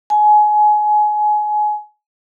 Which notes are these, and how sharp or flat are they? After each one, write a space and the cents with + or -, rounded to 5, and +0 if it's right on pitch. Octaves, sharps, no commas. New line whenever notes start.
G#5 +25